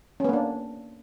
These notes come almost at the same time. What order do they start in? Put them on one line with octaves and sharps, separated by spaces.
C#4 B3 A#3 D4